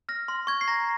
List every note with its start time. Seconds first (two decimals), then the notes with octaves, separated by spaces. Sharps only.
0.09 F6 A#6
0.28 C6
0.47 C#6 G#6
0.61 C7
0.68 A#5 A#6